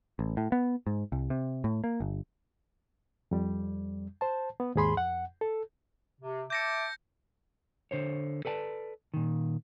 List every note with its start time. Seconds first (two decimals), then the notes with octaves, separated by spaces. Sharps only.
0.19 A1
0.37 A2
0.52 B3
0.87 G#2
1.12 C2
1.30 C3
1.64 A2
1.84 A#3
2.00 G1
3.31 F2 G3
4.21 C5 A5
4.60 B3
4.75 D#2 G#2 G#4 B5 C6
4.96 F2 F#5
5.41 A4
6.21 C3
6.50 E5 A5 D6 G6 A#6 C#7
7.91 D3 C5 C#5
8.45 A4 B4 D5 G#5 A5
9.14 A#2 D#3